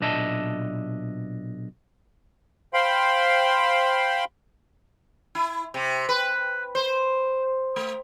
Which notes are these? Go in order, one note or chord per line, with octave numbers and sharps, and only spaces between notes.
B1 A#2 D4 D#5 E5 A5
C5 F5 G5 B5 C6
E4
C3
B4
C5
A3